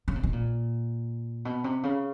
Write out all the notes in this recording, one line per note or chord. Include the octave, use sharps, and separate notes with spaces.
C#3
C3
B2
A#2
B2
C3
C#3